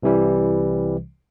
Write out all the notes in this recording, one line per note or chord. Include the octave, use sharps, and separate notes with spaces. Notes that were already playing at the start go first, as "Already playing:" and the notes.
C2 C3 E3 G3